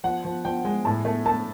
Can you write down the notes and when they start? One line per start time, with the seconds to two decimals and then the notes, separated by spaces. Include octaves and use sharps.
0.04 F3 F#5
0.25 F3
0.45 F3 G5
0.65 G#3
0.85 A2 A5
1.05 A3
1.26 A3 A5